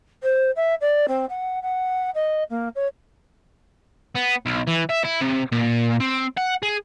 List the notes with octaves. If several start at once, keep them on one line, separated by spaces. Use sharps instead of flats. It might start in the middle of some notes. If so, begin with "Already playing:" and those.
C5
E5
D5
C4
F#5
F#5
D#5
A#3
C#5
B3
B1
E3
E5
E4
C3
A#2
C4
F#5
G#4